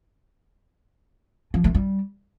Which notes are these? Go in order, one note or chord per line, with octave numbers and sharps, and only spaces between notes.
F3
A3
G3